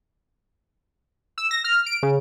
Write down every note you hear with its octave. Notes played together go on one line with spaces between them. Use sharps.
E6
A#6
F6
D7
C#3